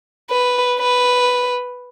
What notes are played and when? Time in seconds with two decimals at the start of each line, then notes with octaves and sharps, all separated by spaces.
0.30 B4
0.79 B4